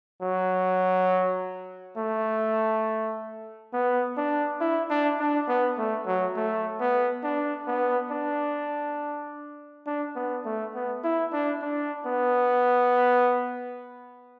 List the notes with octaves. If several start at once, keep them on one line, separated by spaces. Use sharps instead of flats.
F#3
A3
B3
D4
E4
D4
D4
B3
A3
F#3
A3
B3
D4
B3
D4
D4
B3
A3
B3
E4
D4
D4
B3